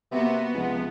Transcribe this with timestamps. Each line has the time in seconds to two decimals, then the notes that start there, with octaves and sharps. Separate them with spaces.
0.11 C3 A#3 B3 F#4
0.54 C#2 C3 F3